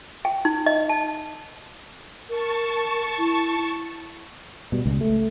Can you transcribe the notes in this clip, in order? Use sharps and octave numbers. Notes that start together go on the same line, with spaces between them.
G5
D#4
D#5
A5
A#4 A5 C#6
E4
B2 G3
C#2
A3